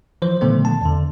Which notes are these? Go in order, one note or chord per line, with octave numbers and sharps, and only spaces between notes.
E3 F3 C5
A#2 D3 D#3 F3 A3 B3
A5
E2 D3